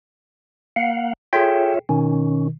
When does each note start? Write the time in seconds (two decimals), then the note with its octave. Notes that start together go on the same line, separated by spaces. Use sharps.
0.76 A#3 F5 F#5
1.33 F4 G#4 A4 C#5 E5 G5
1.89 B2 D#3 C#4